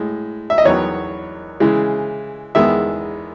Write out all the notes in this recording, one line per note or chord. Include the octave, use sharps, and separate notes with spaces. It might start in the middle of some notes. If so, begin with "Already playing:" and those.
Already playing: A2 G#3
E5
D#5
E2 D#3 F#3 B3 C#5
C#3 E3 G#3
E2 D#3 G#3 B3 E5